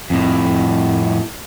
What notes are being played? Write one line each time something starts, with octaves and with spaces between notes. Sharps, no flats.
F2 A2